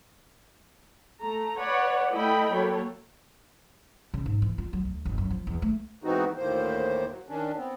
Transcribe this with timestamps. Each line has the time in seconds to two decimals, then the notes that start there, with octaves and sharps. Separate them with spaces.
1.21 A3 A#5
1.58 B4 C#5 D5 F#5
2.13 A3 E4 A4 D#5 G5 B5
2.53 F#3 A#3 A4 C#5
4.14 C#3
4.26 G#2
4.42 E3
4.58 F4
4.73 F#3
4.85 D2
5.05 G1
5.18 F#2
5.30 F3
5.47 E2
5.62 A3
6.04 G#2 E3 B3 C4 D#4 F#4
6.37 D2 A2 D#3 A#3 C5
7.08 F#3
7.29 D#3 C#4 D4
7.56 B3 C4